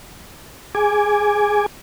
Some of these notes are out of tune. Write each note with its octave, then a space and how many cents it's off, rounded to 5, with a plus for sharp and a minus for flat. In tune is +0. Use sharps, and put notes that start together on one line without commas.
G#4 +0 G#5 +0 D6 +0